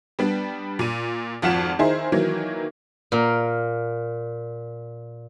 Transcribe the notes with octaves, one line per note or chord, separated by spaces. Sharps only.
G3 B3 D4
A#2 D#7
G#1 F2 F4 F#5 B6 E7
D#3 D#4 E4 G#4 C5
D#3 E3 F#3 A#3
A#2 A#4